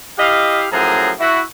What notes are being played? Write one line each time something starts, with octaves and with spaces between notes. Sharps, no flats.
E4 G4 D#5 F5
F#2 A2 F3 G#4 A#5
E4 F#4